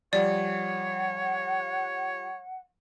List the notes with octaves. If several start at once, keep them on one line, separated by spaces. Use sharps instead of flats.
F3 G3 C#5 D5 F#5